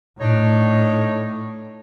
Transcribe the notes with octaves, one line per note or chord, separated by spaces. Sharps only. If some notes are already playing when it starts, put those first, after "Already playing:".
A2 D4 D#4 C#5